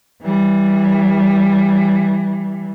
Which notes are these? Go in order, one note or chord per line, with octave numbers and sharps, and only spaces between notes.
E3 G3